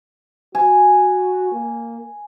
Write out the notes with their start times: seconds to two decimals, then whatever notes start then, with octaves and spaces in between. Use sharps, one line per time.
0.55 F#4 G#5
1.51 A#3